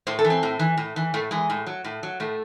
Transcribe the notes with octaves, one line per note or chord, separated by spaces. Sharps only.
A2 C5
A4
E3
C4
A2
E3
A2
E3
A2 A3
E3 G#3
A2
F#3
A2
F#3
A2 A3